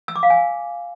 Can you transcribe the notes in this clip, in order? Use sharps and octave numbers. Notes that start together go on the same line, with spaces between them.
E6
D6
F5
G#5